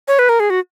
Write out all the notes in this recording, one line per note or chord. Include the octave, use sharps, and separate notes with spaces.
C#5
B4
A#4
G#4
F#4